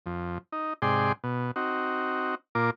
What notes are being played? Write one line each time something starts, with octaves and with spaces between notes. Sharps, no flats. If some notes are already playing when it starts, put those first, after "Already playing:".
F2
D#4
G#2 C3 G#4 D5 G5 C6
B2
C4 D#4 F#4
A#2 F4 A#4 D6